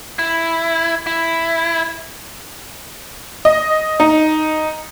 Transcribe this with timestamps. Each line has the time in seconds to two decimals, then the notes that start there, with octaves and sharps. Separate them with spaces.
0.19 E4
1.07 E4
3.45 D#5
4.00 D#4